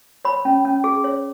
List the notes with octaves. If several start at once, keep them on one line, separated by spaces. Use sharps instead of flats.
C#5 B5
C#4
C#4
G#4
C#5